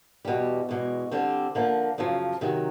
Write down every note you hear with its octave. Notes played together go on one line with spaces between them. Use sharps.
E2 B2 G3
E2 B2 G#3
D3 G3 C4
D3 F3 A#3
F#2 C#3 F3
C3 D#3 F#3